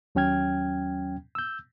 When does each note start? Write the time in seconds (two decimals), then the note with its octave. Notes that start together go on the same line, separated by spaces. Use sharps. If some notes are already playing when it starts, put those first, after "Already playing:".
0.15 D#2 F#3 C#4 G5 F6 G#6
1.35 E6 G6